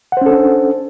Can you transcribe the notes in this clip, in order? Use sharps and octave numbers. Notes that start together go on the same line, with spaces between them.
C#4 D4 A4 C5 F#5